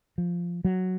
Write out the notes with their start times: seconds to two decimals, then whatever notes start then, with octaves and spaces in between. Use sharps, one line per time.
0.18 F3
0.65 F#3